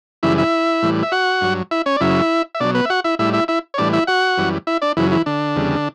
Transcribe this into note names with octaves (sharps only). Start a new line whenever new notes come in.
F#2 C#3 E3 G3 E4 E5
E4 E5
A2 E3 G3
E5
F#4 F#5
G2 F#3
E4 E5
C#4 C#5
D5
F#2 C#3 F#3 E4 E5
E5
B2 F#3 D4 D5
B3 B4
E5
F#4 F#5
E4 E5
A2 G3 E4 E5
E4 E5
E4 E5
C#5
A2 E3 G3 D4 D5
E4 E5
F#4 F#5
F#2 E3 G3
E4 E5
D4 D5
F#2 C#3 E3 F#3 E4
E3 E4
D3 D4
E2 C#3 G3